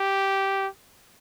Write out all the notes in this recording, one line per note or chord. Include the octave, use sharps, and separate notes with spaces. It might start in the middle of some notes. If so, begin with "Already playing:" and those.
Already playing: G4